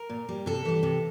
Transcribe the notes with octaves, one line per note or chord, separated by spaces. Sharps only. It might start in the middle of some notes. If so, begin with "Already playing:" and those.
Already playing: A#4
A#2
G3
C3 A4
E3 G3
C3